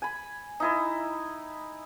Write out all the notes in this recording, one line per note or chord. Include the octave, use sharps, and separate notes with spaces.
G#5 B5
D#4 E4 D#5